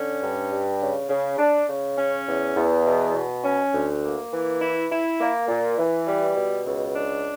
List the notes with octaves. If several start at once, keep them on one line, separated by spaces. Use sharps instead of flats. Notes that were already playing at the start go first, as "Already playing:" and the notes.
Already playing: D3 C#4
G2
G3
C#3
C#3
D4
C#3
C#4
E2
E2
B2
B2
C#4
D2
A#3
E3
E4
E4
A#3
A#2
E3
G3
B2
C#2
D4